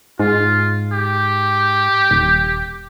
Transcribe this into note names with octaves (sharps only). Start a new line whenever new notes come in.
G#2 F4
G4
D#1